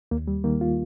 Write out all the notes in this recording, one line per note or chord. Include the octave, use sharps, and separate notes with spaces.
D#2 A#3
G3
D#3 A#3
F4